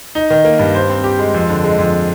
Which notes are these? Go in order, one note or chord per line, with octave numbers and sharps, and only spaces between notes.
D#4
D#3
A#3
G2
C5
C4
G4
G#3
F2
D3
G#3
F2